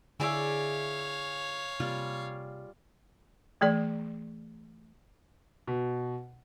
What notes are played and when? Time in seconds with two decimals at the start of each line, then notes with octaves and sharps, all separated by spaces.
0.20 D3 E4 G#4 C#5 D5 E5 F5
1.80 C3 G3 A#3 F4
3.61 E3 A3 G#4 D5
5.67 B2